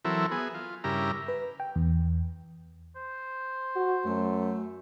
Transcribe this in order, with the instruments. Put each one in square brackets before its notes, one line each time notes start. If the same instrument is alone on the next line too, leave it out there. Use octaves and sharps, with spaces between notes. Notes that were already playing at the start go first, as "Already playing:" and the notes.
[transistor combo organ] E3 F#3 C4 E4 A4 A#4
B3 G#4
F4
G2 C#3 E4 G4 A#4 A#5
[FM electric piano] B4
G5
E2
[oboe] C5
[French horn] F#4
[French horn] F#2 [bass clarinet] A3